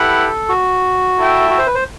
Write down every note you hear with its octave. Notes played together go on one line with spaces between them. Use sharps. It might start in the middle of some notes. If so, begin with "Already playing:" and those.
Already playing: E4 G4 A4 B4 F#5
F#4
E4 A4 E5 G5
F#4
C5
B4
C5